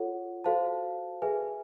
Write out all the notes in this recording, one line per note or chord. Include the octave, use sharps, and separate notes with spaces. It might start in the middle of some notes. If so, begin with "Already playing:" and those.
Already playing: F4 A4 C#5 F#5
F#4 A4 C5 F5 A5
G#4 B4 E5 G#5